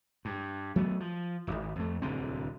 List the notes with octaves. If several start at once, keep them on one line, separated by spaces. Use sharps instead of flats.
G2
F#3 A3 B3
F3
D1 G#1
F2 A3
D1 C2 D3 C4